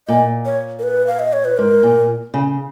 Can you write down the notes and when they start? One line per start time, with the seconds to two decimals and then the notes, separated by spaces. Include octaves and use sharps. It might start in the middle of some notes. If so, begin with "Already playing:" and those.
0.08 A#2 D#5
0.45 C#5
0.79 A#4
0.83 B4
1.07 F5
1.19 D#5
1.33 C#5
1.45 B4
1.57 G#2 A#4
1.83 A#2
2.34 C#3